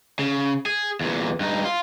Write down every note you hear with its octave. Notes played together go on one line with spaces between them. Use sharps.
C#3
G#4
E2 A#2
G2 D#4
F4